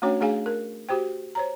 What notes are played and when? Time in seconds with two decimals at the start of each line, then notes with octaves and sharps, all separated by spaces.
0.02 A3 C#4 D4 F#4 C#5 G5
0.21 A3 D4 G#4 F5 G#5
0.46 A#4
0.89 F#4 G4 C5 G5
1.35 C5 C#5 A#5